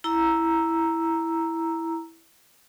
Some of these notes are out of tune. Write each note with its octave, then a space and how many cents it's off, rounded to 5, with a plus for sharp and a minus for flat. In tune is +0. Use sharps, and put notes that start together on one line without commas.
E4 +0 A#5 +0 E6 +0